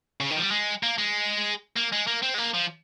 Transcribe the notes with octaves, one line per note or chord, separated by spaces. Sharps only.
C#3
D#3
F3
G3
G#3
A#3
G#3
A#3
G#3
A#3
C4
G#3
A#3
F3